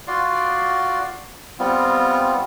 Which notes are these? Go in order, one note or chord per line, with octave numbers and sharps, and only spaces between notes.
F4 F#4 D5 C6
G3 B3 C4 F4